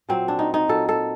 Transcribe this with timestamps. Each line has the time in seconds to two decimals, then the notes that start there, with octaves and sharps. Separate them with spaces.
0.09 A#2 F#3 C4
0.28 D4
0.39 D#4
0.54 D#4
0.68 A#2 F#3 A4
0.89 A4